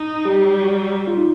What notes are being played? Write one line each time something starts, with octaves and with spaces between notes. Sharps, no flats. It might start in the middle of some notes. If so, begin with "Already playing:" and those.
Already playing: D#4
G3 G4
F4
D#4